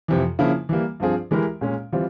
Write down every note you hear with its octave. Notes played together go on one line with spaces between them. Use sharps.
F2 C3 E3
C#3 F3 A#3 E4
E3 G3 A#3
G2 F3 C4 F4 G#4
E3 G#3 E4 G4 A#4
A#2 G#3 C#4
E3 G3 C4 F4